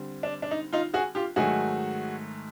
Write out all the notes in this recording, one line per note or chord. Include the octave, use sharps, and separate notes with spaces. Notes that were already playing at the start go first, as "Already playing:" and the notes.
Already playing: D3 G3 C4
D4
D4
D#4
D#4 F4
F#4 G#4
F4 G4
G#2 D#3 F#3 A3 F#4 G#4